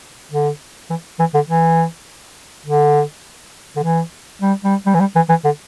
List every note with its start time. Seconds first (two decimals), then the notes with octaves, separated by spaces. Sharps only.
0.32 D3
0.90 E3
1.19 E3
1.34 D3
1.49 E3
2.66 D3
3.76 D3
3.83 E3
4.42 G3
4.64 G3
4.86 G3
4.94 E3
5.00 G3
5.16 E3
5.29 E3
5.44 D3